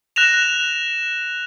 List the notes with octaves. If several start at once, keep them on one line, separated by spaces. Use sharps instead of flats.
F#6 A#6 E7 F7